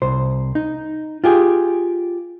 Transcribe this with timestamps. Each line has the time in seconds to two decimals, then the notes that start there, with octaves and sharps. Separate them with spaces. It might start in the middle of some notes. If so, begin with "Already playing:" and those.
0.02 C2 C5
0.55 D#4
1.24 F4 G4 G#4